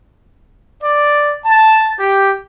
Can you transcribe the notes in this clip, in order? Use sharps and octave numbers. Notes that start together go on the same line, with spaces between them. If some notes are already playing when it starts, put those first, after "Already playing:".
D5
A5
G4